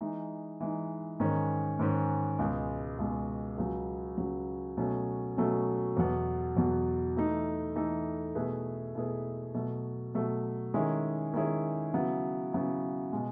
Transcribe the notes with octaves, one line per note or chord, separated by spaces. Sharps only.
E3 G#3 D#4
E3 G#3 D#4
G#2 D#3 G#3 C#4
G#2 D#3 G#3 C#4
C#2 B2 G#3
C#2 B2 G#3
C#2 C#3 F#3
C#2 C#3 F#3
B2 F#3 A3 C#4
B2 F#3 A3 C#4
E2 B2 F#3 B3
E2 B2 F#3 B3
E3 A3 D#4 A4
E3 A3 D#4 A4
B2 A3 E4 G#4 B4
B2 A3 E4 G#4 B4
B2 F#3 A3
B2 F#3 A3
D#3 G#3 C#4 E4 G#4
D#3 G#3 C#4 E4 G#4
C#3 F#3 B3 E4
C#3 F#3 B3 E4
B2 G#3